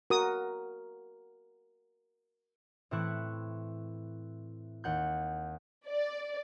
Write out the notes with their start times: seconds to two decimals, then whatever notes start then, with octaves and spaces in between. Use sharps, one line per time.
0.10 F#4 A#4 D#6
2.91 A2 E3 C4 E4 C#6 F#6
4.84 D#2 F#5 G6
5.88 D5